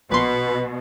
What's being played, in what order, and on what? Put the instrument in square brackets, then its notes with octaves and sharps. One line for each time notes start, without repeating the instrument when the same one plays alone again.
[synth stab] A#1 C6 [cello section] B2 [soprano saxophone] B4